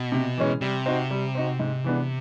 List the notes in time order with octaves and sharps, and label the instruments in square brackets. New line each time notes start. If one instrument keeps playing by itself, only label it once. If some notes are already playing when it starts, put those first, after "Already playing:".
Already playing: [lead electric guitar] B2
[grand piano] C3
E3 G#3 C#4
[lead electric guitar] C3 [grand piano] G3
[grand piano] C4 D#4 F#4
G3
C4 D#4 F#4
G#2
E3 G#3 B3 D4